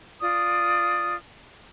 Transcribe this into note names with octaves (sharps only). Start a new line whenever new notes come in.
F4 D5 D#6